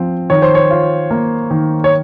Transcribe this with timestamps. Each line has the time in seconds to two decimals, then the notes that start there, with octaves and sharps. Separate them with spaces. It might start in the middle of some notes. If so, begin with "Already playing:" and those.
Already playing: F3 C4
0.30 D#3 C#5
0.42 C5
0.55 C#5
0.71 F4
1.11 A#3
1.51 D#3
1.84 C#5